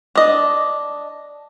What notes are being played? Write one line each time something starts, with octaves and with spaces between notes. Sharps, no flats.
D4 D#5